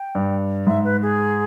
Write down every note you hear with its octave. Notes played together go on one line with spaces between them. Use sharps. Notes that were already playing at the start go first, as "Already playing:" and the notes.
Already playing: G5
G2
G#2 E5
B4
G#4